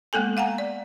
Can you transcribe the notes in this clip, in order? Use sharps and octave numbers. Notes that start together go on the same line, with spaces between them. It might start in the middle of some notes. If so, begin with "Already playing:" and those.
G#3 A#3 B3 A4 G#5
F5 F#5 G#5 A#5
D5